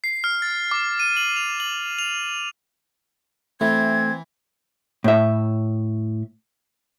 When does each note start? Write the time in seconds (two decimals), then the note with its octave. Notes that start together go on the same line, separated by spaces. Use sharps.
0.04 C7
0.24 F6
0.42 A6
0.71 D6
1.00 D#7
1.17 F#7
1.36 F7
1.60 F#7
1.99 F7
3.61 E3 A3 C4 G#6
5.04 A2 E5